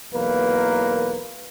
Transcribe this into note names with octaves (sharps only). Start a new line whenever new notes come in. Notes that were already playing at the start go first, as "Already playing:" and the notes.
B1 E2 E3 A#3 A#4 B4